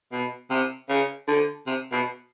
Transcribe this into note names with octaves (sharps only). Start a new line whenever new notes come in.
B2
C3
C#3
D3
C3
B2